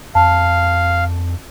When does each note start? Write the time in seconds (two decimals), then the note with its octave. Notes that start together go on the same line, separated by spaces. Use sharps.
0.15 F2 F5 A5